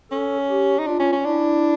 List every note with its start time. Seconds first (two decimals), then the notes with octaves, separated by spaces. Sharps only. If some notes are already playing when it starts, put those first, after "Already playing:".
0.11 C#4 A4
0.49 G4
0.79 D#4
0.87 D4 F4
0.99 C#4
1.12 C#4
1.25 D4 E4